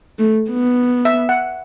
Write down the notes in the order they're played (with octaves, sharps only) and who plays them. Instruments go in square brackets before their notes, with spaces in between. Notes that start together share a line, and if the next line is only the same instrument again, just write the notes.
[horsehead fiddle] A3
B3
[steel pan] E5
F#5